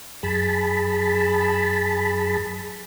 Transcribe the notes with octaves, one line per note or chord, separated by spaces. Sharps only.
F#2 G#4 A5 B5